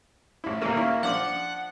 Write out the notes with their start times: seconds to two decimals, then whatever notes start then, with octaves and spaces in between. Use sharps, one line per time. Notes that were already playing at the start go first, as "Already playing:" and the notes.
0.44 A1 E4
0.61 D#2 A3 A#3
0.76 C#4 E4
1.03 F3 D4 F#5 D6